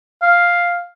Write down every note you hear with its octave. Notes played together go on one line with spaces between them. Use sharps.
F5